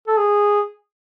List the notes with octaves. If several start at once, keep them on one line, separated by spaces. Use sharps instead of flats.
A4
G#4